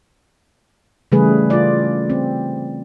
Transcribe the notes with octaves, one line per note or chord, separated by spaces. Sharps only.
C#3 E3 G3 A3 G#4 B4
F4 D5
C4